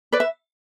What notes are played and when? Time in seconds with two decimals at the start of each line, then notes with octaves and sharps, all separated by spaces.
0.12 B4 D5
0.20 E5